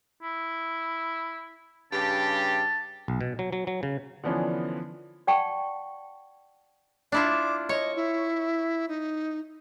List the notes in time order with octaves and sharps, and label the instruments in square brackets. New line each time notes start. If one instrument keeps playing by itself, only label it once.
[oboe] E4
[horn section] G2 C#3 G4 [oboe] A5
[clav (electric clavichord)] B1
B2
F#3
F#3
F#3
C#3
[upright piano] D3 E3 F3 B3 C#4 D4
[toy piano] D5 F#5 G5 A5 C#6
[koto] D4 E4 F4 [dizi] D5
[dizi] D6
[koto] C#5 [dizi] D#5
[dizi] E4
D#4